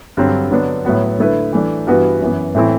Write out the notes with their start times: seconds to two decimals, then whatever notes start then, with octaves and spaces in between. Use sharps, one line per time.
0.17 G2 D3 F#3 C4
0.51 D3 F#3 B3 D4
0.85 A2 F#3 B3 F#4
1.19 D3 A3 E4 B4
1.53 E3 A3 D4
1.87 G2 E3 B3 F#4 B4
2.21 F#2 E3 B3
2.55 A2 E3 A3 C4 E4